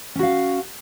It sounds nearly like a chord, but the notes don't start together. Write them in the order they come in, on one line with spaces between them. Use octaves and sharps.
C#4 F#4 F5